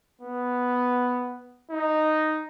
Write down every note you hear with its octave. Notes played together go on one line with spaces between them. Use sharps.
B3
D#4